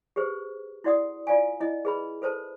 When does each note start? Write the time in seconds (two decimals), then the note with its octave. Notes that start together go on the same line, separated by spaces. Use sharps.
0.16 G4 G#4 B4 C5
0.84 E4 F#4 D5 F#5 D#6
1.27 F4 D5 F5 G#5
1.60 E4 D#5
1.85 G#4 B4 B5
2.22 A4 B4 C5 A5